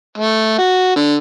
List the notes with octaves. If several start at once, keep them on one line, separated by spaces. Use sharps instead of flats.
A3
F#4
D3